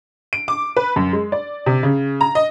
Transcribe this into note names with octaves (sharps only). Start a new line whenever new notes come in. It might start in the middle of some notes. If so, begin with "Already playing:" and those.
D7
D6
B4
F#2
G#3
D5
C3
C#3
A#5
D#5